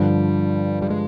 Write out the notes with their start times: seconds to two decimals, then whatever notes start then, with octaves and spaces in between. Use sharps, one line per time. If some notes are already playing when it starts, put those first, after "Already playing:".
Already playing: G2 D3 F3 G3
0.82 G3
0.90 G#3